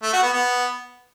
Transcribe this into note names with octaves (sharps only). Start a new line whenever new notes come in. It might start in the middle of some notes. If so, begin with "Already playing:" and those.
A3
F#4
B3
B3